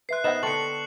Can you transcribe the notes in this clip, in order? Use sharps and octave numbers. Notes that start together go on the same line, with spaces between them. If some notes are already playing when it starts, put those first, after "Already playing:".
B4 E5 C6 F#6 C7
B3 D#4 C5 D#5 E5 F#5 E7
D3 A4 G5 C6 C#6 F#6 C#7 F#7